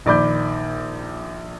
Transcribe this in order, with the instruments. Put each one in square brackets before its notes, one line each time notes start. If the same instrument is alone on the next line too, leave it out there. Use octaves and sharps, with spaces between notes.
[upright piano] A#1 D#3 D5 B5 D6 G6